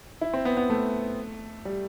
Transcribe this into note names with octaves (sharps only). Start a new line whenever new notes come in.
E4
C4
B3
B3
A3
G3